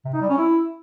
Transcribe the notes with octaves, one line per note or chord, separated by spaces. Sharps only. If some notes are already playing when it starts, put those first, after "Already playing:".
C3
D#4
G3
C#4
E4